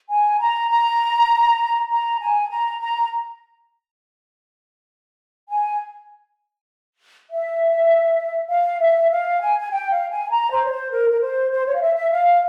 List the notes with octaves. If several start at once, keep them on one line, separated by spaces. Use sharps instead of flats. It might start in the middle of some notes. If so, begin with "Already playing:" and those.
G#5
A#5
A#5
A#5
G#5
A#5
A#5
G#5
E5
F5
E5
F5
G#5
G#5
G5
F5
G#5
A#5
C5
C#5
C5
A#4
A#4
C5
C5
C#5
F5
E5
E5
F5